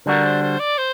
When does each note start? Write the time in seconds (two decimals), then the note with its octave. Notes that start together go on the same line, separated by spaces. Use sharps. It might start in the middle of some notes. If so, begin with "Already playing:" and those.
0.06 D3 G3 D4 F#4 A#4
0.25 C5
0.42 C5
0.59 D5
0.78 C5